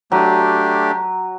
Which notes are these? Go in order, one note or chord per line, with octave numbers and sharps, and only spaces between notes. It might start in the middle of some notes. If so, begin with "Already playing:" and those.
F#3 A3 D4 G4